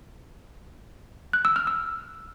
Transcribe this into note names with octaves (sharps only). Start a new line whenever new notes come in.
F#6
E6
F6
E6